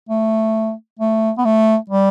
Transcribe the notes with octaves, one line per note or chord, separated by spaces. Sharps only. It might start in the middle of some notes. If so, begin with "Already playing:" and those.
A3
A3
B3
A3
G3